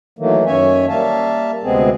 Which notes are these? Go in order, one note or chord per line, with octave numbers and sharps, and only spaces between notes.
D#3 E3 F#3 A3 A#3
F#2 D#3 C#4 C#5 E5 G#5
G3 A#3 E5 F5 A5
D2 C3 G#3 B3 C4 G#4